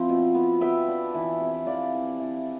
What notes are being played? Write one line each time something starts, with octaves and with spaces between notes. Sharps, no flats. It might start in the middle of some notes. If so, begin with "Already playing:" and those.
Already playing: F3 C4 E4 F5
B2
B3
B3 E5 G5
D4
E3
C3
E3 D5 F5
E3
E3